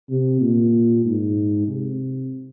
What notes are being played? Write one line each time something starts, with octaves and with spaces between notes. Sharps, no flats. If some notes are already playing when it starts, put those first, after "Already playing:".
C3
A#2
G#2
C3